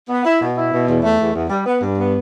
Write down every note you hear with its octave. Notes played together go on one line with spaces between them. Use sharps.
B3
E4
B2
E4
B2
E2
A3
E2
E2
G3
B3
G2
B3